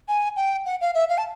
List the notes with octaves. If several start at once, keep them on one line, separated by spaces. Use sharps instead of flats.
G#5
G5
F#5
F5
E5
F5
A5